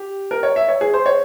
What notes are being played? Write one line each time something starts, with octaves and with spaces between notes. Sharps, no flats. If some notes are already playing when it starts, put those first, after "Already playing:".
Already playing: G4
A#4
C#5
E5
C#5
G#4
C5
C#5